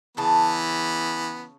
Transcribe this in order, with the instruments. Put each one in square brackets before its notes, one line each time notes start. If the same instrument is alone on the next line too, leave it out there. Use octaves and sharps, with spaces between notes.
[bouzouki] C#3 A5 [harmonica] E3 B3